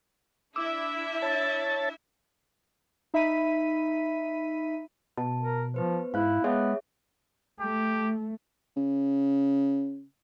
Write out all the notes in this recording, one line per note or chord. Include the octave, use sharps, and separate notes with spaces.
D4 E4 E5 D6 E6
C#5 A5 A6
D#4 E5 B5 B6 D#7
B2 A5
A#4
F3 B3 B4 C5
G#2 E4 F5 F#6
G#3 B3 G#4 C#5 E5
A3 G4
C#3